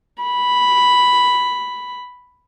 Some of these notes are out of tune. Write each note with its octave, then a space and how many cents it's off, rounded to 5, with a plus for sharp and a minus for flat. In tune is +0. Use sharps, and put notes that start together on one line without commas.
B5 +0